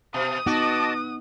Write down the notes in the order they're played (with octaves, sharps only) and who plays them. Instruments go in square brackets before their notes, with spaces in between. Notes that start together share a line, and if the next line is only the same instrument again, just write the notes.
[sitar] B2 [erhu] D#6
[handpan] B3 D#4 [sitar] F#4 [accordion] D#5 A5 D6